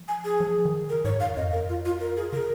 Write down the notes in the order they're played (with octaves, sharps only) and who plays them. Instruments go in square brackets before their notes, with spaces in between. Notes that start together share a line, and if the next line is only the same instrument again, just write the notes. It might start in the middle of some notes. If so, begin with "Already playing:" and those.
Already playing: [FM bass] F3
[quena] G#5
G#4
[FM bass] F3
D#3
[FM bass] C#3 [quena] A#4
[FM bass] G#2 [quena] C#5
[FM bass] F2 [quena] F5
[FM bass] F2 [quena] D#5
[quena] A#4
F4
F4
A#4
G#4
[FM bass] C#3 [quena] A#4